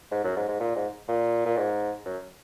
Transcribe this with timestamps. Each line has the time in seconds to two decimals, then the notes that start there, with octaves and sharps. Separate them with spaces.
0.11 G#2
0.24 F#2
0.37 G#2
0.48 G#2
0.60 A#2
0.76 G#2
1.08 A#2
1.45 A#2
1.57 G#2
2.05 F#2